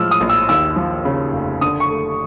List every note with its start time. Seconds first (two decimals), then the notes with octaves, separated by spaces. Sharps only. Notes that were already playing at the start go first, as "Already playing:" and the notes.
Already playing: A2 F3 G#3 E6 F6
0.11 D#6
0.21 A#1
0.30 E6
0.49 D#2 E6
0.76 F3
1.05 C#3
1.33 F1
1.61 D3 D#6
1.80 C#6
1.90 A3